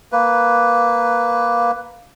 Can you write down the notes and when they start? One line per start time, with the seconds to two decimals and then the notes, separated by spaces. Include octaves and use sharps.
0.12 A#3 B4